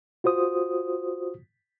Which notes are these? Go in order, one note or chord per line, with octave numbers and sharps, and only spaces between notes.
F4 F#4 C5 D#6